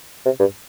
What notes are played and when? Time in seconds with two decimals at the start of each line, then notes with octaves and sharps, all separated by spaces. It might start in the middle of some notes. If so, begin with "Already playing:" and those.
0.25 C3
0.40 G2